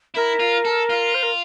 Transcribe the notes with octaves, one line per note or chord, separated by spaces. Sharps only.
E4 A#4
F4
A4
F4
C5
A#4